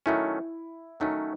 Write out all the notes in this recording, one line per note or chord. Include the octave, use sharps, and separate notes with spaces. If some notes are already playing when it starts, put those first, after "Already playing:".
D#3 F#3 A3 C#4 E4
D#3 F#3 A3 C#4 D#4